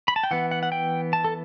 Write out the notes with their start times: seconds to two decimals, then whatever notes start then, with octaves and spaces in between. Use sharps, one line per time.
0.08 B5
0.16 A5
0.23 G5
0.31 E3 B3 F#5
0.51 F#5
0.63 F#5
0.72 G5
1.13 A5
1.25 A4